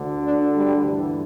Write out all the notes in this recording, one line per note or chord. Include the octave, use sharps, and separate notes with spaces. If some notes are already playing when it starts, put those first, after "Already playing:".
Already playing: D2 D3
D4
G3
G2 E3